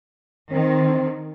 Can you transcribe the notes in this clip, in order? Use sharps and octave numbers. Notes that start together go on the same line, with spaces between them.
D#3 C4